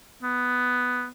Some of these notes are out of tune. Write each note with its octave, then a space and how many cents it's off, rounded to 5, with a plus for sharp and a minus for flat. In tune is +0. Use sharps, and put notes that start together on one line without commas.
B3 +5